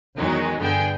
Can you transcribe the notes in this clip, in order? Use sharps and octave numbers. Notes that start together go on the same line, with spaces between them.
E2 D#3 F#3 G#3 D#4
G2 D3 B3 G#4 G5